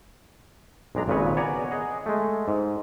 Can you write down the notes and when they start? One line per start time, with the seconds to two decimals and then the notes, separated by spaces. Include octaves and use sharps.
0.95 B1 G#3 D4 A#5
1.08 G#1 A#2 C#3 B4 C#5
1.37 B3 C#5 D5 F#5 G#5 A#5
1.71 G#4 D#5 F#5
2.06 G#3 A3
2.48 G#2